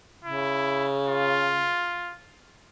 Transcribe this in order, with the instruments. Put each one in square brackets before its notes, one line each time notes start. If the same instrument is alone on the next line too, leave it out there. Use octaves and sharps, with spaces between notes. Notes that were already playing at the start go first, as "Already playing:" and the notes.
[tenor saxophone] C#3 [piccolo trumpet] E4
[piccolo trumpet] F4